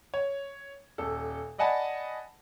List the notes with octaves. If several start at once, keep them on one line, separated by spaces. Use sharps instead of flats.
C#5
D#1 A4
D5 D#5 F#5 G#5 A5 B5